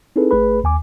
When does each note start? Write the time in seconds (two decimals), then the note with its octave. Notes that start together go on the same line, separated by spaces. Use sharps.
0.16 C4 D#4 E4 G#4 A4 B4
0.31 G#1 A3 G#4 B4 B5
0.64 D#2 G#5 D6